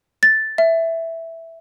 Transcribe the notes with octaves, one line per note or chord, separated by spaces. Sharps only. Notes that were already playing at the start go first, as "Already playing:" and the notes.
A6
E5